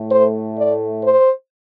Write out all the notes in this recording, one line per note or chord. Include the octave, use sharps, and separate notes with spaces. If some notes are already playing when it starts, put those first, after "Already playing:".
Already playing: A2 A3
C5
D5
C5